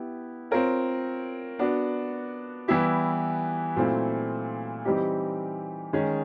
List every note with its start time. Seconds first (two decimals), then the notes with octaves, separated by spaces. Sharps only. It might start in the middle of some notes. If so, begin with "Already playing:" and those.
Already playing: B3 E4 G4
0.51 C4 F4 A#4 C#5
1.59 B3 D4 F#4
2.68 E3 G3 B3 E4 G4
3.76 A#2 F#3 A3 C4 E4
4.85 E3 G3 C4 D#4 G4
5.93 D#3 G#3 C#4